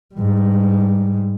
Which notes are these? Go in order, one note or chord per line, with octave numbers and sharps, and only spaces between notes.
G#2 G3